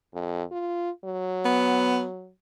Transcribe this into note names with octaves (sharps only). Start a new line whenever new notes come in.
F2
F4
F#3
B3